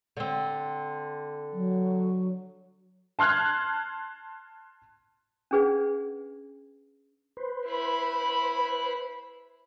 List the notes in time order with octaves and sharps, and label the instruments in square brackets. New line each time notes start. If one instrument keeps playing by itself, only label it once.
[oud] D3 C4
[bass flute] F#3
[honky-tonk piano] A5 C6 F6 F#6 G#6
[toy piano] C#4 D4 G#4 B4 D5 F#5
[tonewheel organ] B4 C5
[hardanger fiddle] E4 B5